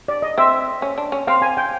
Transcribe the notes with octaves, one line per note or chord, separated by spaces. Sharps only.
D5
D#5
C4 E5
C#4
D4
C#4
C4 F5
G#5
G5